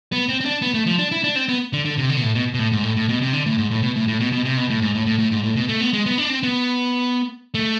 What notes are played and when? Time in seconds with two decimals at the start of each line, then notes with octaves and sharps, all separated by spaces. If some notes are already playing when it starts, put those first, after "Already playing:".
0.12 B3
0.29 C4
0.40 C4
0.45 D4
0.62 B3
0.74 A3
0.86 F3
0.98 D4
1.12 E4
1.24 D4
1.36 C4
1.48 B3
1.73 D3
1.85 D3
1.98 C3
2.09 D3
2.17 B2
2.23 A2
2.35 B2
2.54 B2
2.59 A2
2.72 G#2
2.84 A2
2.97 A2
3.09 B2
3.22 C3
3.33 D3
3.46 A2
3.58 G#2
3.71 A2
3.82 B2
3.96 A2
4.08 A2
4.20 B2
4.32 B2
4.45 C3
4.57 B2
4.70 A2
4.82 G#2
4.94 A2
5.07 A2
5.19 A2
5.31 G#2
5.44 A2
5.56 B2
5.69 A3
5.81 B3
5.93 G#3
6.06 B3
6.18 D4
6.30 C4
6.43 B3
7.54 A3